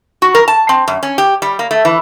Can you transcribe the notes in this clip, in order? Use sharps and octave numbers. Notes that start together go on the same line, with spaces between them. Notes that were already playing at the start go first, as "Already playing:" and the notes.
F#4
A#4
A5
C4
F#2
C#4
G4
G3
A#3
A3
E3